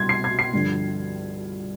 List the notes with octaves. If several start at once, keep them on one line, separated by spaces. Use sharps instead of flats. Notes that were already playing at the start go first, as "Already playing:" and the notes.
Already playing: C2 B2 C6 G#6
C7
G#6
C7
G2 D3 F3